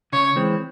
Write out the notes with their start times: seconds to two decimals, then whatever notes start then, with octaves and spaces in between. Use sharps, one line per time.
0.12 C#3 C#5
0.36 E3 G#3 C4